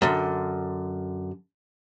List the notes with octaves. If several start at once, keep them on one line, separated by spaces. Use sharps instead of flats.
F#2 D3